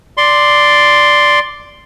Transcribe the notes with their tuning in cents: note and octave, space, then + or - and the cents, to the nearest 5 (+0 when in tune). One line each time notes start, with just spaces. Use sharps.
D5 +0 C6 +0